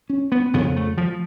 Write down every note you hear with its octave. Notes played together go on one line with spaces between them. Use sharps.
C#4
B3
F2 C#3 B3
A3
F3